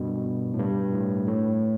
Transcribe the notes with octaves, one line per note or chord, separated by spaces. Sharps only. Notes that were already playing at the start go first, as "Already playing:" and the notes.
Already playing: G2 B2
A2
G2
A2
A2